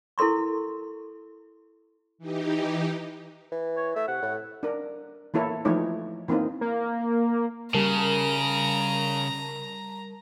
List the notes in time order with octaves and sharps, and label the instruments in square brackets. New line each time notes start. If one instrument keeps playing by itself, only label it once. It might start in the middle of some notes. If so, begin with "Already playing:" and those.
[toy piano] E4 A4 A#4 C6 C#6
[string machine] E3 D#4 G4
[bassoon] E3
[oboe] C#5
[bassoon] A3 [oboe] E5
[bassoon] C3 [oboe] F#5
[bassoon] A2
[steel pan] D4 A#4
E3 A#3 E4 A4 C#5
E3 F3 A3 D#4 C#5
E3 A#3 C4 D#4
[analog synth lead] A#3
[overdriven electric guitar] C#3 [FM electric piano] G3 A#4 A5 [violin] A#5